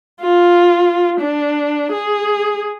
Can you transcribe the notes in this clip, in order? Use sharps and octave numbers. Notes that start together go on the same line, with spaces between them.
F4
D4
G#4